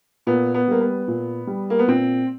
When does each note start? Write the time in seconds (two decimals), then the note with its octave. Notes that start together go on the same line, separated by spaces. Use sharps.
0.27 A#2 B3
0.54 B3
0.68 G3 A#3
0.81 B3
1.08 A#2
1.47 G3
1.70 A#3
1.79 B3
1.87 A#2 C4